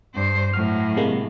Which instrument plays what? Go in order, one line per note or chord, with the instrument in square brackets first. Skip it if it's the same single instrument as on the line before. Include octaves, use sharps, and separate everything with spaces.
[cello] G2 C5
[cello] A2 F#3 [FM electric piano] F6
[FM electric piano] C3 G#3 A#3